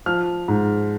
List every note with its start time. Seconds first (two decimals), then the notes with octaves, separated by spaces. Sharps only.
0.06 F3 F6
0.48 G#2